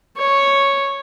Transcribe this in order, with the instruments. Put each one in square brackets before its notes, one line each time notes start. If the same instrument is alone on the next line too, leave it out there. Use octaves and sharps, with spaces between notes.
[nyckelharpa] C#5